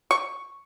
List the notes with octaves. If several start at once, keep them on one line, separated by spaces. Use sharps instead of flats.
C#6